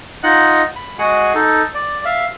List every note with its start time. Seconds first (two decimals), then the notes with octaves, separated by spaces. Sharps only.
0.23 D#4 F4 D#5 F#5 F#6
0.76 B5
0.99 G#3 F#4 G#4 F#5 G#5
1.35 D#4 A4
1.75 D5
2.05 E5 F5